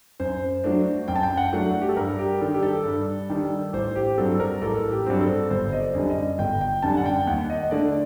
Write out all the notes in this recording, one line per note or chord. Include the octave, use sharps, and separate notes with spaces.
F#2 C5
F#3 A3 D4
F#2 G5
A5
G5
F#5
F#3 A3 D4
G4
A4
G2 A#4
G4
D#3 G3 D4 A4
G4
A4
G2
D#3 G3 D4
A1 C5
G4
G2 F#3 C4 A4
A4
A#4
A1 A4
G4
G2 F#3 C4
A4
G1 C5
D#5
D5
F#2 D3 G3
D#5
G1 G5
G5
F#2 D3 G3 A5
F#5
G5
D#2 F#5
D#5
D#5
D3 A3 D4 D5